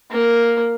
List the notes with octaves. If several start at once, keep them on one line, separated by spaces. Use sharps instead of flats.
A#3